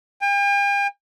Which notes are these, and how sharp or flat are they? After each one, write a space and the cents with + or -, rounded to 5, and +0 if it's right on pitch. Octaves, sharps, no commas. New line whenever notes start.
G5 +45